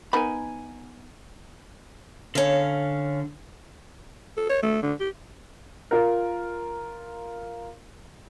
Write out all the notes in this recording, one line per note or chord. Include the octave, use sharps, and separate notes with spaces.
B3 D#4 A#4 G#5 B5
D3 C#4 F5
A4
C#5
A3
D3
G4
F4 A#4